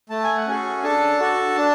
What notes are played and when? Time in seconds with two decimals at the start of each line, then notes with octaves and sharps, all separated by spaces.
0.10 A3 A5
0.24 G#5
0.37 F#5
0.47 C#4 F#4 G#4 A4 G#5
0.83 D4 A4 A5
1.20 F#4 A4
1.57 D4